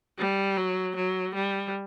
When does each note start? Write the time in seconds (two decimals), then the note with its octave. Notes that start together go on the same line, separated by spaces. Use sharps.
0.18 G3
0.57 F#3
0.96 F#3
1.35 G3